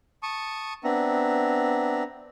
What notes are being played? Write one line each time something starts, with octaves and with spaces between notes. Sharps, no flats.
A5 C#6 D#6
B3 C4 D4 E5 A#5